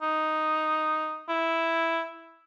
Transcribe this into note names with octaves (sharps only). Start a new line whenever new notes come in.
D#4
E4